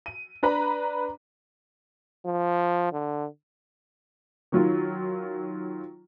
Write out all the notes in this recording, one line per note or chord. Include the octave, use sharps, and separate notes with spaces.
D#7
D4 B4 A#5 B5
F3
D3
D#3 F#3 F4